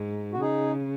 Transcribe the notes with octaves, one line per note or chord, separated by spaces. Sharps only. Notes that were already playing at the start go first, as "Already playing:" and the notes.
Already playing: G#2
F#4
C#3 D#4 G#4